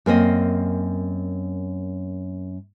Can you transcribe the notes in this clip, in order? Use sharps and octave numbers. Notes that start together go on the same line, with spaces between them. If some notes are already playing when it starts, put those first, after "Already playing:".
F#2 A#3 C4 D#5